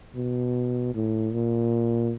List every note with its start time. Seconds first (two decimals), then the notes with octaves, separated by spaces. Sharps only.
0.15 B2
0.94 A2
1.33 A#2